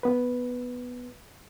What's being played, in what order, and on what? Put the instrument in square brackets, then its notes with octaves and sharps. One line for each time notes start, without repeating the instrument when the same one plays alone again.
[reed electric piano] B3 B4